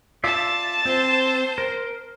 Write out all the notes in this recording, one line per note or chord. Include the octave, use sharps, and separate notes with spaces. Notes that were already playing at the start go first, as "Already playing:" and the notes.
F4 D5 E5 A5
C4 C5
A#4